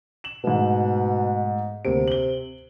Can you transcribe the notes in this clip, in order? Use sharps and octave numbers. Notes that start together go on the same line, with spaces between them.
E7 F#7
G#2 B2 A3
D2 C3 A#3 D7
F#7 G7